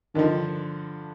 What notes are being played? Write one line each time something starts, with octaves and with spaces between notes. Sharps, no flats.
G2 D3 D#3 F3